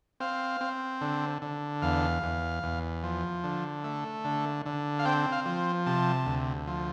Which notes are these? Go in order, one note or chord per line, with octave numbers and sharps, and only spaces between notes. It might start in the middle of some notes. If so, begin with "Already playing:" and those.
C4 F5
C4
D3
D3
E2 F5
E2
E2
F3
D3
A3
D3
D3
F5
C4 G5
F5
F3
C3 A5
D2
F3